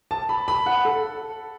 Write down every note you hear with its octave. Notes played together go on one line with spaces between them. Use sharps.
A5
B5
B5
F#5
A4